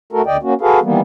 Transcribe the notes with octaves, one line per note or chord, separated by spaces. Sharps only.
A3 F#4 A4 A#4
D2 D3 D5 D#5 G5
A#3 C#4 F#4
F#4 G#4 A4 B4 F5
D#3 E3 G3 A#3 B3